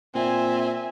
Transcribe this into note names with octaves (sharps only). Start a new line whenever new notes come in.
A#2 C4 E5 G#5